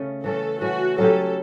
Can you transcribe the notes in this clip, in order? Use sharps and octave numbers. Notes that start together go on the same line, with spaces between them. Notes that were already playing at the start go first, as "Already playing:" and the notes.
Already playing: C#3 A3 C#4
E3 A3 C#4 A4
E3 A3 C#4 F#4
F#3 C#4 E4 G4 A4